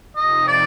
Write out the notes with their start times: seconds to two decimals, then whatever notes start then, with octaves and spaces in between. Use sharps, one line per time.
0.15 F2 C3 F3 C4 D#4 D#5
0.47 D5